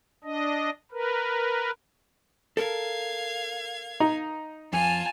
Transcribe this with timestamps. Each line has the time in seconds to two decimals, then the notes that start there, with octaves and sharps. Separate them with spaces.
0.24 D4 D#5
0.92 A#4 B4
2.57 A4 A#4 F5 G#6
4.00 D#4
4.73 F2 F4 G#5 A5 F6